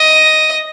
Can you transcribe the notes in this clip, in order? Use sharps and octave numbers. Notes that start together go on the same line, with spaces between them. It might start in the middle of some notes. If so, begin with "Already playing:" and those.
Already playing: D#5